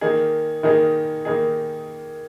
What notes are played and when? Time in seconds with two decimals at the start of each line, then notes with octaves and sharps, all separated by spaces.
0.01 D#3 A#3 D#4 G#4
0.63 D#3 A#3 D#4 G#4
1.25 D#3 A#3 D#4 G#4